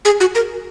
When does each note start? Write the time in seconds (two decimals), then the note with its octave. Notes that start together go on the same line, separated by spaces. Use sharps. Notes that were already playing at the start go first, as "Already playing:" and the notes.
0.05 G#4
0.20 F#4
0.35 A#4